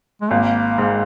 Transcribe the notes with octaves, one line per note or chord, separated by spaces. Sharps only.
G#3
G#1 A#3
G#2